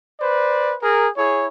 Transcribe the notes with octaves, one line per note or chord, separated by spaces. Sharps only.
B4 C5 D5
G#4 A#4
E4 G#4 C#5